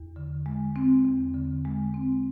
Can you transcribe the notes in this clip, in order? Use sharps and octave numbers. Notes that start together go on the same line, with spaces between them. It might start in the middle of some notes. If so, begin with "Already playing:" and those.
Already playing: E2
D3
G#3
C4
E2
D3
G#3
C4